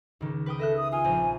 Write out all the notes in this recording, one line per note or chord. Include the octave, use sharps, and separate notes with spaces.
C#2 D#3
B4 G5 D#6
A4 D#5 E5 F#6
D#6
F4 G#5
A#1 C4